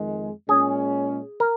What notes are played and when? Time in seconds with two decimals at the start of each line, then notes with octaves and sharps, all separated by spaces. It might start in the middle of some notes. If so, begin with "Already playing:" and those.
Already playing: F2 D#3 G#3
0.49 A#2 G#3 C#4 G#4
1.40 A#4